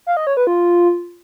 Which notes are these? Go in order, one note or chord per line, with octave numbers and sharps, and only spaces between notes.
F5
D#5
C#5
B4
F4